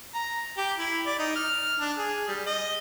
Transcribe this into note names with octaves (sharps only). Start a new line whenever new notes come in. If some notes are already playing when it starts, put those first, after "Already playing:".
A#5
G4
E4
D5
D#4
F6
D4
G#4
G3
D#5